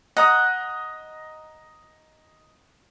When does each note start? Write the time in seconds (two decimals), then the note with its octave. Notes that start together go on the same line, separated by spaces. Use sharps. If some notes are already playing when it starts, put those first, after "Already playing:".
0.17 D#5 F#5 A#5 D#6